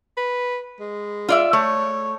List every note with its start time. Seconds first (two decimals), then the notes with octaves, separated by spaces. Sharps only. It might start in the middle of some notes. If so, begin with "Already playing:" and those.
0.17 B4
0.80 G#3
1.29 F4 D5 E5
1.53 A3 C#5